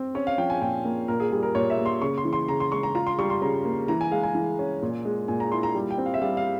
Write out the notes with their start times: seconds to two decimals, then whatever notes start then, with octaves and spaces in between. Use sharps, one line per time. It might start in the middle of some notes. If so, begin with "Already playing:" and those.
Already playing: C4
0.15 C#4 C#5
0.27 F5
0.38 F3 G5
0.50 G#5
0.61 A#2 G5
0.85 A#3
1.08 A#2 A#4
1.20 G#4
1.32 G3 G#4
1.43 A#4
1.55 A#2 C#5
1.70 E5
1.78 A#3
1.86 C6
2.02 C#3 C#6
2.18 C6
2.25 E3
2.33 C6
2.48 C#3 A#5
2.60 C6
2.72 G#3 C#6
2.83 A#5
2.95 F4 A#5
3.07 C6
3.19 G3 C#6
3.30 C6
3.42 C#3 A#5
3.65 A#3
3.88 E3 A#5
4.01 G#5
4.11 G#3 F5
4.23 G#5
4.35 E3
4.59 C#4
4.82 A#2
5.05 G#3
5.28 A#2 G#5
5.40 A#5
5.52 E4 C6
5.63 A#5
5.75 G3
5.91 G5
5.98 C4
6.06 F5
6.14 E5
6.22 G3 F5
6.37 F5